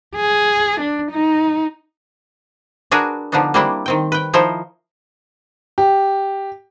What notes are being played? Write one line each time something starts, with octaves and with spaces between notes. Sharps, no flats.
G#4
D4
D#4
D4 F#4 G#4 A#4 B4
D3 F3 B3 D4 D#4
G3 A3 A#3 C4 D4 E4
D#3 C4 G5
B4 G5
D#3 F3 D#4 E4 C5
G4